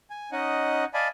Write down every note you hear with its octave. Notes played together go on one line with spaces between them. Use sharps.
G#5
C#4 D#4 D#5 F#5
D5 D#5 F5 G#5 A5 B5